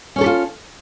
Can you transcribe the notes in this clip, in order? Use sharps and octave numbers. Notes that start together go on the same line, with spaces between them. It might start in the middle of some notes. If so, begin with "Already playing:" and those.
C#4 F4 G4 A4 C#5